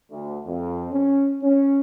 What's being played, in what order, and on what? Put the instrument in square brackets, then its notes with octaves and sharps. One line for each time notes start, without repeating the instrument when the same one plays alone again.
[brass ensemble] D2
F2
C#4
C#4